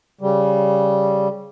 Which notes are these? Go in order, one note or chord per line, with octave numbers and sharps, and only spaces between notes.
C#3 G3